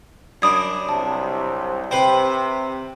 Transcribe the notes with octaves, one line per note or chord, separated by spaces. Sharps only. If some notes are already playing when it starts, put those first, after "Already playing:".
F#2 D4 B5 D#6 G#6
C2 C3 A5
C3 B4 C5 G5